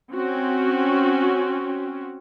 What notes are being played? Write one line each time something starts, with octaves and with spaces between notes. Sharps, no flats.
C4 C#4 F#4